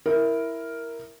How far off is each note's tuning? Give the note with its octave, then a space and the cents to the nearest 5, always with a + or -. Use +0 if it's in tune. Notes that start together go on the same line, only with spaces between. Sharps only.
E4 +0 A#4 +0